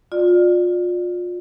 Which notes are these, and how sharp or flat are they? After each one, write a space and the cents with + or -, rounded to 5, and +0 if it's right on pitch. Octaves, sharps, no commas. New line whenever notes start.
F4 +30 D5 +15